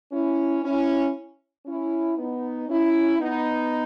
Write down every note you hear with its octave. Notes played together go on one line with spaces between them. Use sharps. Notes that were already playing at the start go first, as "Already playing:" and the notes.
C#4 E4
C#4 E4
C#4 E4
B3 D#4
C#4 E4
B3 D#4